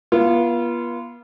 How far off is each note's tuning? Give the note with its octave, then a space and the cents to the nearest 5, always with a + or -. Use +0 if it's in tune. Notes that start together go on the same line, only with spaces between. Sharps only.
B3 -40 F4 -25